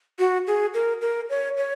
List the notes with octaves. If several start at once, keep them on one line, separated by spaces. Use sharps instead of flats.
F#4
G#4
A#4
A#4
C#5
C#5